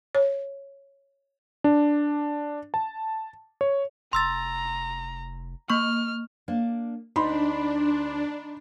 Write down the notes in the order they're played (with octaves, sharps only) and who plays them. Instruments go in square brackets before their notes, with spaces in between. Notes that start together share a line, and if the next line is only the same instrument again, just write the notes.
[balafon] C#5
[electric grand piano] D4
A5
C#5
[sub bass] F1 [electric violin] A#5 [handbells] C6 E6 A6
[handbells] A#3 C#6 [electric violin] F6
[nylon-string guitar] A#3 D4
[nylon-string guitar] D2 [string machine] D4 [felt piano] D#4 B5 C6